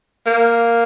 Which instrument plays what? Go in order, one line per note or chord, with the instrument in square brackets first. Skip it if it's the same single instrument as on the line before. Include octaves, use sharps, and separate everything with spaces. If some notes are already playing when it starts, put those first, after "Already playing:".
[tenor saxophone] A#3